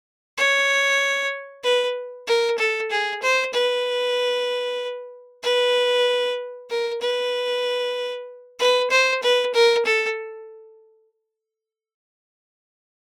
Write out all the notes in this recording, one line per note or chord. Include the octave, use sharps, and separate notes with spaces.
C#5
B4
A#4
A4
G#4
C5
B4
B4
A#4
B4
B4
C5
B4
A#4
A4